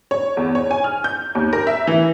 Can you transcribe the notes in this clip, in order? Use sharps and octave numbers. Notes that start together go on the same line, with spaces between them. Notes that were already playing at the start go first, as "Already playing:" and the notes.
C#5
E2
C#5
G#5
F6
G6
D#2
A#4
E5
E3